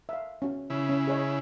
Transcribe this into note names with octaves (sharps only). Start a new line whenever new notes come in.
E5 F5
C#4 F#4
C#3 E4
C#4
G#4 C#5 D#5